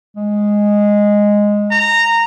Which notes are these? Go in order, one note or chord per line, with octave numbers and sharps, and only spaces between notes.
G#3
A#5